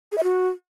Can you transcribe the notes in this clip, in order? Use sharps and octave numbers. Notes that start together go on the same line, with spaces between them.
G#4
E5
F#4